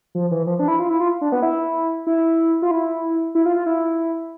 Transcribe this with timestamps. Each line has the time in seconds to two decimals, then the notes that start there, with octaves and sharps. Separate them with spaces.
0.15 F3
0.31 E3
0.47 F3
0.59 D4
0.68 E4
0.79 F4
0.89 E4
1.00 F4
1.21 D4
1.32 B3
1.42 E4
2.07 E4
2.62 F4
2.71 E4
3.35 E4
3.46 F4
3.56 F4
3.66 E4